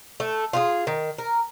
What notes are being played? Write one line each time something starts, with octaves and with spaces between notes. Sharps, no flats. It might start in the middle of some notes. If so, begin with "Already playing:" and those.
A3
F4 G4 G#4
D#3
A#4